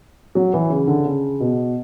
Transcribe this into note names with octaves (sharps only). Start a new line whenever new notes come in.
F#3
E3
C#3
D3
C#3
B2